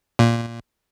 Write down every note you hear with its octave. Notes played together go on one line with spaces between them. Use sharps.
A#2